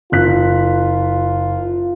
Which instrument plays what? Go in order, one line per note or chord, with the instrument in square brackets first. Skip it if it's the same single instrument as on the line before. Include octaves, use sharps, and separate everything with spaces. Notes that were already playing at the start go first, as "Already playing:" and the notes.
[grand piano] F#1 F#6 B6 [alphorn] F4